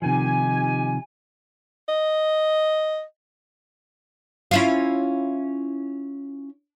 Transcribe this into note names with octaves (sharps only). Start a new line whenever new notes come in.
C3 D#3 F3 D#4 G4 G#5
D#5
C#4 E4 F4